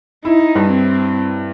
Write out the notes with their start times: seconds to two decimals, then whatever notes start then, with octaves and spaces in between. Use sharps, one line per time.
0.25 D#4 E4
0.55 G2
0.70 C4